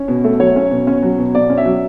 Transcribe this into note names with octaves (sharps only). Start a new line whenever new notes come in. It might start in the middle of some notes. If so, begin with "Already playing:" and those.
Already playing: C#4
B2
A3
F#3 C#5
C#4
B2
C#4
F#3
B2
B2 D5
C#4
E5
F#3